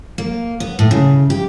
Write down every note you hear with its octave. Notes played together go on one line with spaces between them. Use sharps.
A#3
B3
A2
C#3
G4